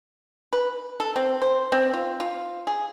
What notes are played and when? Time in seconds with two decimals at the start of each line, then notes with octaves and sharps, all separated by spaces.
0.53 B4
1.00 A4
1.16 C4
1.42 C5
1.72 C4
1.93 F4
2.20 F4
2.67 G#4